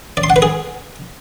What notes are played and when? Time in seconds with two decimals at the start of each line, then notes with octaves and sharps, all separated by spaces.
0.17 D5
0.24 C6
0.30 F#5
0.36 B4
0.42 G#4